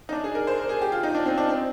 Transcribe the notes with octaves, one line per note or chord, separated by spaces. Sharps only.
D#4
D4
G#4
A#4
C5
A#4
G#4
G4
F4
D#4
D4
C4
D4
C4